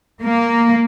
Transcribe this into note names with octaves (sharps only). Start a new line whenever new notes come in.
A#3